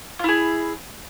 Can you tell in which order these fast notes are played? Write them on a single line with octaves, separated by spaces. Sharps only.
F4 E4 G#4